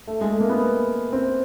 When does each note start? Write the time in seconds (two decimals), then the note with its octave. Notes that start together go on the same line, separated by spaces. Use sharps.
0.07 A3
0.21 G#3
0.31 A3
0.40 A#3
0.49 B3
1.13 C4